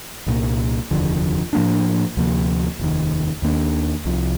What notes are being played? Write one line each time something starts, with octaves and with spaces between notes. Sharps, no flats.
C2 A#2 G3 A#3
F1 D#2 D3 F3
A2 F3 A#3 D4
D2 C3 F3 A#3
F1 D#2 D#3
D#2 D#3 A#3 D4
C2 C3 F3